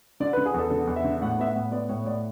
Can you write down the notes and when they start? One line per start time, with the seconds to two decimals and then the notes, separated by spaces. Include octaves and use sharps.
0.20 D3 D5
0.33 B4
0.37 D3
0.46 G#4
0.54 E2 A4
0.70 D3 A4
0.87 E2
0.96 E5
1.04 D3
1.22 A2 F#5
1.39 B3 E5
1.47 F#5
1.55 A2
1.72 B3 D5
1.89 A2 C#5
2.06 A2 D5